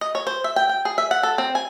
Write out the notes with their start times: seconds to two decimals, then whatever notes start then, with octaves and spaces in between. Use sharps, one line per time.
0.01 D#5
0.15 C#5
0.27 C5
0.44 E5
0.56 G5
0.69 G5
0.85 G#4
0.98 E5
1.11 F#5
1.23 A4
1.38 C4
1.55 G#5